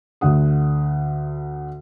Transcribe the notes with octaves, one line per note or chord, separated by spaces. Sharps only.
D2 D3 F#5 D#6